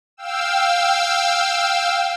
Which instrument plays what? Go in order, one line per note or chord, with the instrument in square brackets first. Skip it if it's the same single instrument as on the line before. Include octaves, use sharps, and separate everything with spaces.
[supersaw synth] F5 G5 E6